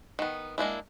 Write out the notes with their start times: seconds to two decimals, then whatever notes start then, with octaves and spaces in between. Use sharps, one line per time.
0.19 D#3 B3
0.58 G#3 A#3 D4 E4